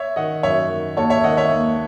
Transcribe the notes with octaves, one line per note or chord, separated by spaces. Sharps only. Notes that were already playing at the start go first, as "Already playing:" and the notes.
Already playing: C#5 E5
D#3 D#5 F#5
F#2 C#5 E5
D#3
D#2 A4 C#5
C#5 E5
D#3 D#5 F#5
C#5 E5
D#2